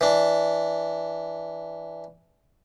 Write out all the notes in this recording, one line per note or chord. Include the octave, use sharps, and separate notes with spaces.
E3 D4